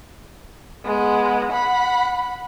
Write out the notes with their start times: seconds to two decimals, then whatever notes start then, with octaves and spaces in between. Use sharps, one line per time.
0.86 G#3 B3
1.52 F#5 B5